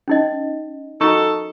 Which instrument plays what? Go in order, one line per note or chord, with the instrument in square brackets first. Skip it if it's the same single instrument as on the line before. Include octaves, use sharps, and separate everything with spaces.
[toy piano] C#4 D#4 D#5
[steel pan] D#4 F#4 [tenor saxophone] A4 [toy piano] C#6